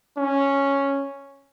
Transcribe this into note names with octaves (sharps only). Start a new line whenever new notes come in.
C#4